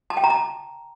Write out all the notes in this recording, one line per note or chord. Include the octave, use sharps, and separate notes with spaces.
A5
G5
A#5
A5